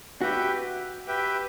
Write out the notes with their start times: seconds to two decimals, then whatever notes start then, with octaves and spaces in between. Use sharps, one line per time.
0.21 F#4 G4 B4 E5 G5
1.07 G4 B4 E5 G5